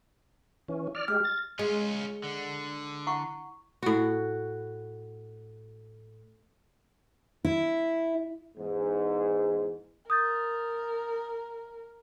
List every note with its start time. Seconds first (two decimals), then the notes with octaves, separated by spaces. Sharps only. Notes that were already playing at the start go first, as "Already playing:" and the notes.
0.68 E3 C#4
0.95 D5 F6
1.08 G#3 G4 F6
1.24 A6
1.59 G#3 C#4 F4
2.24 D3
3.07 E4 F#5 C#6
3.83 A2 F#4
7.45 E4
8.57 E2 G#2
10.10 A#4 D#6 G6 A6